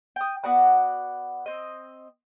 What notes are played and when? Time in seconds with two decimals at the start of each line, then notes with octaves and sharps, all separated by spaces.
0.16 G5 D#6
0.44 B3 F#4 D5 F#5
1.46 C4 D#5